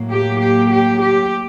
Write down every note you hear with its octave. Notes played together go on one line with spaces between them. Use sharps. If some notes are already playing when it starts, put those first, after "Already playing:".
Already playing: A2 F#3 A#3
G4
G4
G4
G4